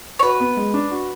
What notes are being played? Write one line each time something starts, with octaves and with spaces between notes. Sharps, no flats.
C#5
F#4 B4
B3
G#3
D4
F#4